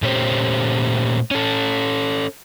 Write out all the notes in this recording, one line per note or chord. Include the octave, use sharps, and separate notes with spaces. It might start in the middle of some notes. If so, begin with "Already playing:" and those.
A#2 A3 C#4 G4 C5
C#4 A4